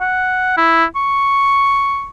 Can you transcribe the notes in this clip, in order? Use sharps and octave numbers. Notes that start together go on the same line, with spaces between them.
F#5
E4
C#6